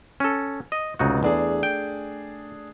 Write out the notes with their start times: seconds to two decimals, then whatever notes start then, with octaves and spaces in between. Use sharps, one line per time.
0.20 C#4 A4
0.72 D#5
0.99 F1 C#2 D#4 F#4
1.23 E2 A3 D4 G#4
1.63 G5